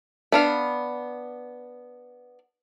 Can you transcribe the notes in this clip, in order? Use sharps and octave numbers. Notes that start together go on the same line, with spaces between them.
B3 D4 F5